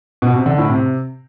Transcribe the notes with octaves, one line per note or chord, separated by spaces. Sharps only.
B2
C3
D3
A2
C3